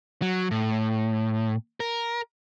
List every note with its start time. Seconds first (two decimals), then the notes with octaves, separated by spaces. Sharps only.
0.22 F#3
0.51 A2
1.80 A#4